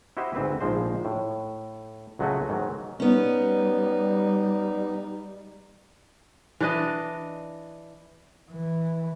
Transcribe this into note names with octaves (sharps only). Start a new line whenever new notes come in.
E4 F#4 G4 C5 D#5 E5
D2 G#2 C4 B4
A#1 G#2 F3 G#3 C5
A2
C#2 F#3 G#3 A3 F#4 D#5
G#2 D#3 F#3
G3 B3 C#4 D#4
E3 D4 D#5
E3